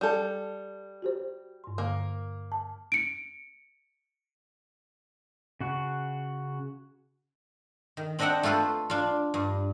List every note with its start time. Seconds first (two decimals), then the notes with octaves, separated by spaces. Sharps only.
0.01 G3 A4 G6
1.02 F#4 G4 C5
1.64 G2 C6
1.78 D3 A#3
2.52 A5
2.92 C#7 D7
5.61 C#3 F#4
7.97 D#3
8.19 C4 D4 D#5 E5 F#5 G5
8.43 A3 F4 A4 B4 C5
8.90 D4 F4
9.34 G2